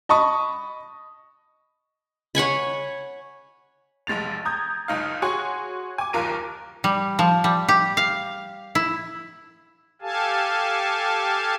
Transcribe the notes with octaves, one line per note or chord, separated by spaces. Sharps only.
D#5 A5 B5 C#6 D#6
C#5 F#5 G#5 B5
F1 B1 G#3 A6 F7
A#5 D#6 G6 G#6
F#1 C#2 D#4 F5
F#4 G#4 C#5 G#5 C6 C#6
G#5 D6
F#1 D#2 F4 A#4 D#7
G3
F3
G3
G4
F5
E4
G4 A4 F5 G#5 A5